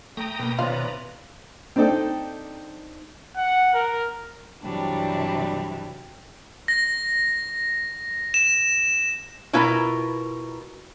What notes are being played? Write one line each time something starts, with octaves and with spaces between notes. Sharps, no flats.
A3 G5 A#5 D#6
B2 A#3 B4
C3 D#3 C#4 F4 B4 D5 A#5
C4 D4 D#4 A4 G5
F#5
A#4
G2 C3 E3 F#3 G3 D4
A#6
E7
B2 E4 F4 A#4 B4 A#5